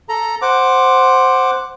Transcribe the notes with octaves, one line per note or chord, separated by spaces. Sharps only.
A4 A#5
C5 F#5 D6